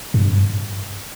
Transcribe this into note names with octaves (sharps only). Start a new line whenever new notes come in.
G2